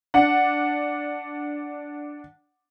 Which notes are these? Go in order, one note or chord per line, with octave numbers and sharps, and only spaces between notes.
D4 F#5